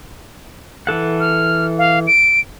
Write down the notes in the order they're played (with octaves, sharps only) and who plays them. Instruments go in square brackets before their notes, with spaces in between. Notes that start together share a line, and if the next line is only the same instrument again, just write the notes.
[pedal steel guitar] E3 A4 F#5
[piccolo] F6
F5
D7